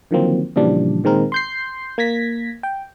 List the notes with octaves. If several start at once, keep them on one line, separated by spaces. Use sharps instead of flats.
D3 D#3 F3 F#3 A#3 C4
A#2 C#3 E3 F3 G3 D4
A#2 D#3 G#3 C4 A#4
C6 G6 C7
A#3 G#6 A#6 B6
G5